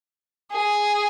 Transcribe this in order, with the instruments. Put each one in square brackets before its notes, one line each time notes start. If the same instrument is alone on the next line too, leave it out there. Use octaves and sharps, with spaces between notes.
[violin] G#4